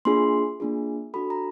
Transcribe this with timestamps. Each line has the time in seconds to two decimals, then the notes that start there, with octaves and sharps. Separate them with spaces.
0.05 A#3 D4 F4 G#4 C6
0.60 A#3 D4 F4 G#4
1.14 D4 F#4 A4 B5
1.30 A#5